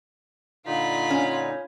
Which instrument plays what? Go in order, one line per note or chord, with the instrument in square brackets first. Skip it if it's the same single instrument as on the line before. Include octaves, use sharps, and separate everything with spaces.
[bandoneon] A#2 D3 D#4 [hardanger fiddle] F4 B5
[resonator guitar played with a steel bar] C#4